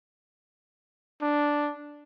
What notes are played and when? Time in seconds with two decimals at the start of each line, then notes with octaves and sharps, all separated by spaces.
1.22 D4